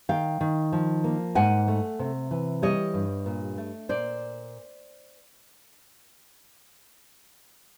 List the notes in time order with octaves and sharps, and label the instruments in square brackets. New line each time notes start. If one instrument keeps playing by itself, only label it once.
[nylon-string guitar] D#3 F5 G5
D#3
F3
A#3
G#2 F#5 G#5
A3
C3
E3
G3 C#5 D#5
G2
A#2
A3
A#2 C5 D5